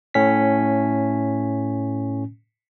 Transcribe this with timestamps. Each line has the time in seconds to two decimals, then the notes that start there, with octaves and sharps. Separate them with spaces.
0.14 A2 C#4 B6